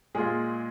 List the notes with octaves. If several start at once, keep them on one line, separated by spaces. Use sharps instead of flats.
A#2 G#3 F4 G#4